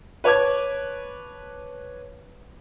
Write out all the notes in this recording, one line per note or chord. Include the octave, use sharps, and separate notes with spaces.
B4 C#5 A5 D6 G#6